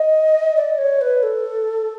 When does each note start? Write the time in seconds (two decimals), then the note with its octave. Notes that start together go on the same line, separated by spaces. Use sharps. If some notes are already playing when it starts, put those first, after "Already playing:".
Already playing: D#5
0.56 D5
0.78 C#5
1.01 B4
1.23 A4